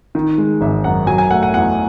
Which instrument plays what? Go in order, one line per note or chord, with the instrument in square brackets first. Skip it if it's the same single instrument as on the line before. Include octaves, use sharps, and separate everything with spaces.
[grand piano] D#3
G#3
[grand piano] G#1 [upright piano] E5
[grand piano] F#2 [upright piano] F#5
[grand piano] F#3 [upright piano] G#5
[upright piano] G#5
[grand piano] A3 [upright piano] F#5
[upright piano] F#5
[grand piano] E2 [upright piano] F#5